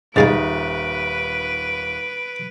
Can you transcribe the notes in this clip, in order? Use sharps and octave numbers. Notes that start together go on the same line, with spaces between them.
D#1 C#3 D#4 B4 F5 G#5 A6 D7